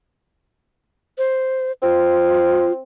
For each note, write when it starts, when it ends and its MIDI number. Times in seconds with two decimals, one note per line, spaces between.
1.18 1.72 72
1.83 2.82 60
1.83 2.72 65